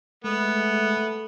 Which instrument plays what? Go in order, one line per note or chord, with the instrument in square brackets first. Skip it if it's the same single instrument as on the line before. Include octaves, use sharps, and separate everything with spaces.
[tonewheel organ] G#3 [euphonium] A3 [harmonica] B3